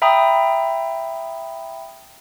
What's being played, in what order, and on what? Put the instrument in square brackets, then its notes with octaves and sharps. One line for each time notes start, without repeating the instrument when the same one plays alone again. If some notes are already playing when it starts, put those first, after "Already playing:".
[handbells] E5 G5 A#5 B5 D#6